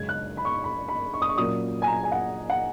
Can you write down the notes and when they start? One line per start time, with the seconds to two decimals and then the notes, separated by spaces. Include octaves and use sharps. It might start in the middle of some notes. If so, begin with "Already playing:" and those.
Already playing: F#2 C#3 G#3 G#6
0.09 F#6
0.37 B5
0.45 C#6
0.64 B5
0.88 B5
1.13 C#6
1.22 D#6
1.29 C#6
1.38 A#2 F#3 A#3 C#4 D#6
1.82 G#5
1.87 A#5
2.04 G#5
2.12 F#5
2.50 F#5